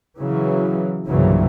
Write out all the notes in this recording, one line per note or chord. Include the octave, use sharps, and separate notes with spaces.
C#3 E3 F#3
C2 G2 A#2 C#3 E3 F#3